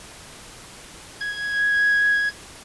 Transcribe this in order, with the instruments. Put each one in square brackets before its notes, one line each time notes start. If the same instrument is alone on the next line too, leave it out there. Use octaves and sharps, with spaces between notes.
[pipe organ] G#6